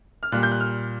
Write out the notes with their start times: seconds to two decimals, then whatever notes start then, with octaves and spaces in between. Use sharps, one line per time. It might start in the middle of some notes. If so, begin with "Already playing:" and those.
0.23 F6
0.32 A#2 G3 F#6
0.43 G6
0.52 F#6
0.60 F6